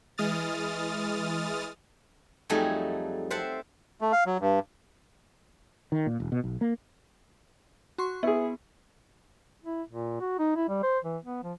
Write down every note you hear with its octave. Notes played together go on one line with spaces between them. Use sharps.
E3 G#3 D#6 F6 A6
F2 F#3 G3 A3 D#4 G#4
C4 C5 E5 F#5 A5
A3
F5
F#3
G2
D#3
A#2
E1
B2
B1
A#3
F#4 C6 C#6
B3 E4 G#4
E4
A#2
F#4
D#4
E4
G3
C5
E3
B3
F3